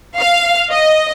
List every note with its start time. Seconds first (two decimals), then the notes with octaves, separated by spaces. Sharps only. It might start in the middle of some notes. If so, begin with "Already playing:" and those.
0.18 F5
0.71 D#5